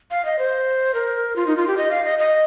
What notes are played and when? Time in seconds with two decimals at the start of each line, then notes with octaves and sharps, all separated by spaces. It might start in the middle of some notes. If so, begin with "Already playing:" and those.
0.11 F5
0.25 D#5
0.39 C5
0.94 A#4
1.36 F4
1.47 D#4
1.57 F4
1.67 G4
1.77 D#5
1.91 F5
2.05 D#5
2.19 D#5